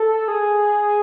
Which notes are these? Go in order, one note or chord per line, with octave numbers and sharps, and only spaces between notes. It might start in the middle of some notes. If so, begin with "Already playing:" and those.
Already playing: A4
G#4